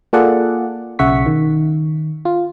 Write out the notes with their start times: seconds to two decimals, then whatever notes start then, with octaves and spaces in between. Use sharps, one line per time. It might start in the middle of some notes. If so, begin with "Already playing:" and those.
0.13 A#3 F4 G#4 A4 D5 F#5
0.99 B1 C#3 E5 F#5 C#6 B6
1.26 D#3
2.25 F4